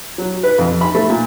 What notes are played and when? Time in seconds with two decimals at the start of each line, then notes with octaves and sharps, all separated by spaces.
0.18 F#3
0.43 B4
0.58 F2
0.81 B5
0.95 A3
1.09 A#2